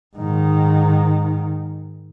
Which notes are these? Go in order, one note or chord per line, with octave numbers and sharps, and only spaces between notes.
G#2 D#3